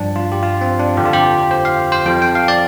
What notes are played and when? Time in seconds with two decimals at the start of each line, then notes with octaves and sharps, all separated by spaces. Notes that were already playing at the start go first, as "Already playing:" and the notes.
Already playing: G2 F3 D4
0.16 F4
0.32 G4
0.43 F4
0.61 C4
0.79 D4
0.97 F2 D3 F3 G4
1.06 F4
1.13 G4
1.51 C5
1.65 F5
1.92 C5
2.06 F2 F3 G5
2.22 G5
2.35 F5
2.48 D5